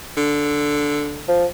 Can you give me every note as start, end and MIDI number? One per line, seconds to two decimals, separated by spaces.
0.17 1.27 50
1.29 1.45 53